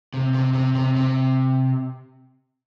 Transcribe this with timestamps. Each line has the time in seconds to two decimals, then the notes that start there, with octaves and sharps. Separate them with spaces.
0.14 C3
0.34 C3
0.54 C3
0.75 C3
0.97 C3